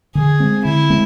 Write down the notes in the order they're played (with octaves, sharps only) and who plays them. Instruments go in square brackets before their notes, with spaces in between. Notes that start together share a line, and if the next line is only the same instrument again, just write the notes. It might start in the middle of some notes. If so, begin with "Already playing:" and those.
[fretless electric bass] D3 [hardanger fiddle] G#4
[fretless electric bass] G#3 C4
[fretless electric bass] D3 [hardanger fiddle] E4
[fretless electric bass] G#3 C4